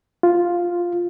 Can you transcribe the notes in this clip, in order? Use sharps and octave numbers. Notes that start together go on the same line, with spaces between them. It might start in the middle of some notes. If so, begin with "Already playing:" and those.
F4